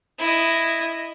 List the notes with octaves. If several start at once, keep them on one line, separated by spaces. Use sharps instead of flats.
E4 D#5